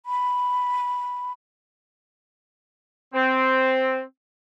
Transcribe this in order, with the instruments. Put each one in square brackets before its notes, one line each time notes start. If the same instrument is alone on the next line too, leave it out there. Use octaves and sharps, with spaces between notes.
[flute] B5
[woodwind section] C4